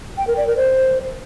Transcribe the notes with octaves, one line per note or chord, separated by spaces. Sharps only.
G5
A#4
D5
A#4
C5